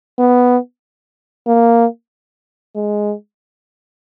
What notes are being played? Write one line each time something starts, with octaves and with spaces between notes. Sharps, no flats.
B3
A#3
G#3